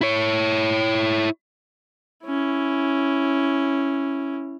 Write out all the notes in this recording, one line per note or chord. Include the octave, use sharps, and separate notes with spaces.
E4 C#5
C#4 E4